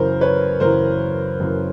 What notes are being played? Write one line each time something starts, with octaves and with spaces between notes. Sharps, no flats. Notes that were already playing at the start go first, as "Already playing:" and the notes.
Already playing: F#2 C#3 E3 A#4 C5
B4 C#5
F#2 C#3 E3 A#4 C5
F#2 C#3 E3